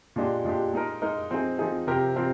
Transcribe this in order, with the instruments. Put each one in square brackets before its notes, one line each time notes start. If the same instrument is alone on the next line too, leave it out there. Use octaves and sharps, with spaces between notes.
[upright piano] A#2 G#3 D4 G4
A#2 G#3 D4 G4
G#3 D#4 A#4
G#3 D#4 A#4
F3 C4 D#4 G#4
F3 C4 D#4 G#4
C3 F3 C4 G4 A#4
F3 C4 G4 A#4